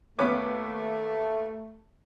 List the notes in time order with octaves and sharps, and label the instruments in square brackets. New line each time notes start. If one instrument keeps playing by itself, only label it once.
[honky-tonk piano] D#2 B4 D6 [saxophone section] A3 [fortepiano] B3 C#4